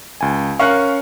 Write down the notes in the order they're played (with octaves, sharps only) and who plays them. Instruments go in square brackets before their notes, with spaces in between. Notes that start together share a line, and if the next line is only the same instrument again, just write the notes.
[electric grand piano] C#2 G#5
[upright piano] C#4 A#4 F5 [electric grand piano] C#6 F#6